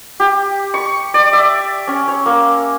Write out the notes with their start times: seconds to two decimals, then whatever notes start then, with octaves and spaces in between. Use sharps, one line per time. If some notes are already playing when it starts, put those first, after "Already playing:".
0.20 G4
0.74 C#6
1.14 D5
1.33 E5
1.88 C#4
2.08 C#5
2.26 A#3